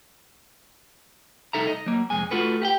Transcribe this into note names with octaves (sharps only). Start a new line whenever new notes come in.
C2 C#3 D#4 A4 E5 A#5
D#5
F#3 A#3
C2 F2 G#3 G#5
A3 F4 F#4 A4 B4
G4 F#5 G5